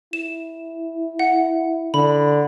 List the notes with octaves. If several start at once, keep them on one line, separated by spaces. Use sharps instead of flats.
E4 E7
F#5
D3 B5